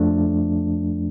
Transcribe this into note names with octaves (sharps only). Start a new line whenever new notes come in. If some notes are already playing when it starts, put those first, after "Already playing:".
Already playing: F2 F3 A3 D4